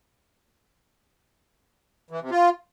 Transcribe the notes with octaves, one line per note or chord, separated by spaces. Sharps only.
E3
C3
F4